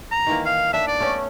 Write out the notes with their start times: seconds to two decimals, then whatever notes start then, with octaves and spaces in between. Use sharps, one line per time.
0.11 A#5
0.27 D#3 E3 A#3
0.46 F5
0.73 D4 E5
0.88 D5
1.00 A3 B3 C#4